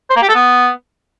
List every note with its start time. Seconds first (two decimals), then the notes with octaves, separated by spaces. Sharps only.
0.10 C5
0.16 A#3
0.22 G4
0.29 A4
0.35 B3